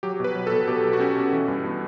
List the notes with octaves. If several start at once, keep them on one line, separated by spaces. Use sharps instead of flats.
F#3 G4
B2 B4
F#3
A4
B2
B2 G4
F#3
F#4
C#4 G4
B2
E3
G2
B3